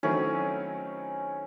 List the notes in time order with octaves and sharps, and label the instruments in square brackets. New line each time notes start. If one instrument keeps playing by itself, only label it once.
[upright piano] D#3 F#3 A3 C4 E4 [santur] C#4